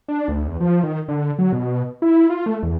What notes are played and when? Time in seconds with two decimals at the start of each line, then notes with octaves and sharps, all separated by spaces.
0.08 D4
0.28 D2
0.47 E2
0.60 F3
0.83 D#3
1.08 D3
1.39 F#3
1.53 B2
2.02 E4
2.30 F4
2.46 A3
2.63 E2